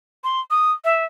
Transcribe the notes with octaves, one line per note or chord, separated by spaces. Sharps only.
C6
D#6
E5